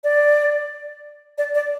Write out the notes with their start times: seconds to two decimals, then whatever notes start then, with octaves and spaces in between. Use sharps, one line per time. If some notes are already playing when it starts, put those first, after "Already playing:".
0.04 D5
1.38 D5
1.55 D5